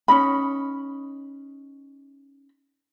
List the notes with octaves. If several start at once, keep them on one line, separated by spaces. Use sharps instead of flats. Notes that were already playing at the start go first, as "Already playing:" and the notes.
C#4 D#4 B5